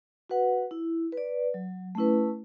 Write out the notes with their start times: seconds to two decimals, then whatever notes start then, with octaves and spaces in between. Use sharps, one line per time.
0.30 F#4 B4 F#5
0.71 E4
1.12 B4
1.17 D5
1.54 F#3
1.95 A3 C#4 E4 B4